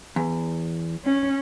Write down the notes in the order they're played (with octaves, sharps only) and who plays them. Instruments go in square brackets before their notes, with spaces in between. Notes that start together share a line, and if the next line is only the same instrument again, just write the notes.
[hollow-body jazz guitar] E2
[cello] C#4